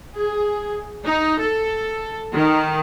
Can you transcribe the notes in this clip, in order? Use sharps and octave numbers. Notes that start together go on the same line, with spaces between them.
G#4
D#4
A4
D#3